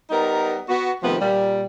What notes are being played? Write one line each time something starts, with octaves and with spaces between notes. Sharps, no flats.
G3 B3 D#4 A#4
B3 F#4
C3 D#3 F3 A3 B3
A#2 G3